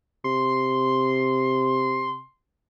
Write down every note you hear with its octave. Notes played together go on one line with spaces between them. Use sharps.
C3 C6